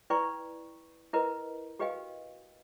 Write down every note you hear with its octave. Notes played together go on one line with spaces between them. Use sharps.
E4 B4 D5 G5 B5 C#6
E4 A#4 B4 D#5
F#4 G4 B4 D#5 F5 G5